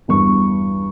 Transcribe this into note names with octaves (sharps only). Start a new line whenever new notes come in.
E2 G2 C#6